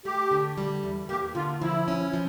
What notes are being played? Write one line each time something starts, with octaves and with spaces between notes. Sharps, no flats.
A3 G4
D3
G3
E2
A#3 G4
D3 F4
F3 E4
C#4
F3